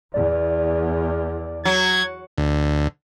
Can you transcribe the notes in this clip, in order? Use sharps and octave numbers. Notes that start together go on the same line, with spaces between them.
E2 D5
F#3 G#6
D2